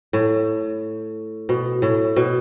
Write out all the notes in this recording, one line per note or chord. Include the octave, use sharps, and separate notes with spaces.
A2
B2
A2
B2